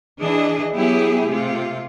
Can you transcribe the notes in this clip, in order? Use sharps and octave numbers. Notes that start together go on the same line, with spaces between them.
E3 D4 G#4 D#5
F#3 B3 E4 G4 G#4
C3 A3 F4